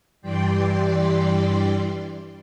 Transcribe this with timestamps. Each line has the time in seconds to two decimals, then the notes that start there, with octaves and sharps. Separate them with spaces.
0.22 G2 E3 G3 D5 G5 C6